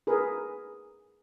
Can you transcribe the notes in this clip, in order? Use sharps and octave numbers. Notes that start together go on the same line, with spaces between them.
G#4 A#4 B4